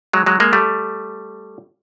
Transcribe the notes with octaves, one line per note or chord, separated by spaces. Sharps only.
F#3 G#3
F#3 G#3
G#3 A#3
G3 A3